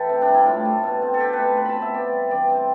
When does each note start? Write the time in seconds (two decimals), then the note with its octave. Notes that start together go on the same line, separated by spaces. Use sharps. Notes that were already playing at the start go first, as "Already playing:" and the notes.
Already playing: E3 A4 E5 G5
0.09 C3
0.22 D4
0.28 G3
0.34 E4
0.46 A2 F4
0.65 A3
0.83 B2
1.02 C4
1.14 A4
1.20 C4 G4
1.33 B4
1.39 A3
1.57 B2 B4
1.65 A5 B5
1.76 C4
1.82 E5
1.94 B3 D5
2.13 G3
2.31 E3 D5
2.49 C4